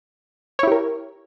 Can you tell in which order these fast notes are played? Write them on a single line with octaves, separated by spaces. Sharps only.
C#5 E4 G4 A#4